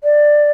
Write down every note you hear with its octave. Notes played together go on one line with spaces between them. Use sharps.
D5